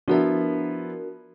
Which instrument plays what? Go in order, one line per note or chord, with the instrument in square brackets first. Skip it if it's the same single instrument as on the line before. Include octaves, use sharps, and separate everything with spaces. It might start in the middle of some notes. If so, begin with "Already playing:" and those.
[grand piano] F3 B3 E4 [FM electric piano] D4 F#4 A#4